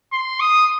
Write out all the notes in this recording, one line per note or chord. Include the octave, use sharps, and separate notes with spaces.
C6
D#6